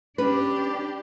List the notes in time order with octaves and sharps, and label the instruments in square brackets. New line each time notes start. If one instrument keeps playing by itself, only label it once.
[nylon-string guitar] C#4 B4 [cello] D4 G4